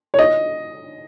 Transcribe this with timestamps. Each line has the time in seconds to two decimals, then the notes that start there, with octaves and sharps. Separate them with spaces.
0.14 C#5
0.19 D#5